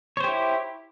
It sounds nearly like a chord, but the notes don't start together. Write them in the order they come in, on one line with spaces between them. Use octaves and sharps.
C#5 C5 G4 E4